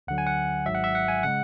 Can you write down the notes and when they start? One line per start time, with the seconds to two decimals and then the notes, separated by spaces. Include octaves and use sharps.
0.07 D2 D3 F#3 F#5
0.18 G#5
0.27 F#5
0.66 G#1 G#2 F#3 E5
0.75 F#5
0.84 E5
0.95 F#5
1.08 G#5
1.23 C#3 G#3 F#5